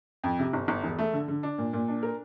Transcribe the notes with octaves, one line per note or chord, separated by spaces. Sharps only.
F2
C3
G1
G1
E1
A3
D3
D3
D4
A#2
A#2
D4
A#4